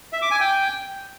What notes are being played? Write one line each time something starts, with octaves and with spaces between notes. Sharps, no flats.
E5
D6
G#5
G5